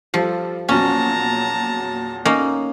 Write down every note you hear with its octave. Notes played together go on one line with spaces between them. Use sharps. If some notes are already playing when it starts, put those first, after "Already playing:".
F3 G3 F4 A4
E2 A#2 F#3 C#4 A5 A#5
A#3 C#4 D#4